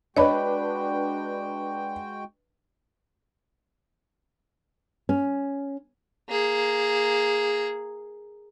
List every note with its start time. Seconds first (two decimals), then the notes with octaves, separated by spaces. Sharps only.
0.17 G#3 D4 F#4 B4 C#5 D#5 G5 B5
5.09 C#4
6.29 A#3 G#4